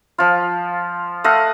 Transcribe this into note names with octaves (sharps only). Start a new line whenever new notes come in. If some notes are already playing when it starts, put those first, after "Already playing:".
F3 F4
A3 D#5 F5 F#5